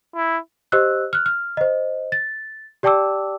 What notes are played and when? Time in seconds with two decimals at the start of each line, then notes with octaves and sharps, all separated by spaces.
0.16 E4
0.72 G4 C5 D#5 E6 F#6
1.13 F6 F#6
1.26 F6
1.57 C5 D#5
2.12 A6
2.83 G4 D5 G5 A5 D6 E6